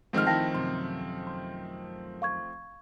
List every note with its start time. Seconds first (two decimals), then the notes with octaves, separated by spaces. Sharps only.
0.13 G#2 D#3 F3 A3 C4 F6
0.27 D#3 E4 F5 G5 A5 A#6
0.54 F#2 C3 C6
1.27 C6
2.22 F5 C#6 G#6